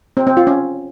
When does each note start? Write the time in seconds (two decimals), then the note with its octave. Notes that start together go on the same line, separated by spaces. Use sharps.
0.17 C4
0.27 C4
0.37 F4
0.47 C#4